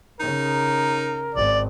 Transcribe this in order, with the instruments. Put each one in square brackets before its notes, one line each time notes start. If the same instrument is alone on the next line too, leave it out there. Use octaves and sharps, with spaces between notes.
[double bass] C#3 [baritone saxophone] D#4 [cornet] A#4
[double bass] G#1 [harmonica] D5